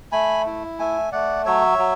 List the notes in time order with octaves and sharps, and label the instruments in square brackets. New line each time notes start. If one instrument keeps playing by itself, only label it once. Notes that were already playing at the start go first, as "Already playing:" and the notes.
[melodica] A3 G#5 B5
E4
A3 E5 G#5
A3 D5 F#5
F#3 C#5 E5
F#3